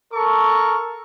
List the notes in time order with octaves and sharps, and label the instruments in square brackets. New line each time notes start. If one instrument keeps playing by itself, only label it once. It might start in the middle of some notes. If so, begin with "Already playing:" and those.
[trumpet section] A4 A#4 C#6